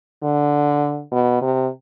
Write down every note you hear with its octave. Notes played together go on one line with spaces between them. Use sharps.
D3
B2
C3